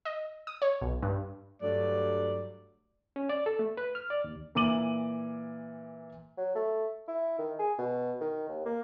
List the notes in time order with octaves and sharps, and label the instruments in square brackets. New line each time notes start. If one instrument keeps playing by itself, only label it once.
[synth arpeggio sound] D#5
D#6
C#5
B1
G2
[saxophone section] G2 F#3 A3 D5
[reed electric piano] C#4
D5
A4
A3
B4
F6
D5
D#2
[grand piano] A#2 E3 D6 D#7 F#7
[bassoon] F#3
A3
E4
D#3
G#4
B2
D#3
D#2
A#3